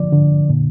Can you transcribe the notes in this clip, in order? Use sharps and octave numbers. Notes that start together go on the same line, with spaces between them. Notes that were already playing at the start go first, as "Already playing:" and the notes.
Already playing: D3 F3 D5
D3
A#2